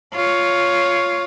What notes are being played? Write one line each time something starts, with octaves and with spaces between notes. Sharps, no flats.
F4 C#5